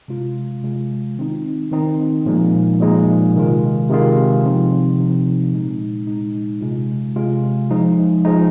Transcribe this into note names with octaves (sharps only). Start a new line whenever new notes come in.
C3 G#3 F4
C3 G#3 F4
D#3 C4 D#4
D#3 C4 D#4
A#2 F3 G#3 D#4
A#2 F3 G#3 D#4
C3 D#3 G#3 F4
C3 D#3 G#3 F4
C3 F3 C4 D#4
C3 F3 C4 D#4
A#2 G#3 D#4
A#2 G#3 D#4
C3 G#3 F4
C3 G#3 F4
F3 G#3 D#4
F3 G#3 D#4